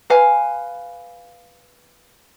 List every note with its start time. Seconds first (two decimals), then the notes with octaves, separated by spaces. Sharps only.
0.10 B4 F5 G#5